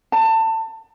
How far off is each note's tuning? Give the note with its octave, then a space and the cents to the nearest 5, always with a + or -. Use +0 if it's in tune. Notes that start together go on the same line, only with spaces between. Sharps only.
A5 +25